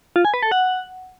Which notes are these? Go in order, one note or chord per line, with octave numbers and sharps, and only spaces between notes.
F4
G#5
B4
A4
F#5